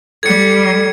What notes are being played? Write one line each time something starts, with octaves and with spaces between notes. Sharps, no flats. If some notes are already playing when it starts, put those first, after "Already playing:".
G3 A4 G#6 C#7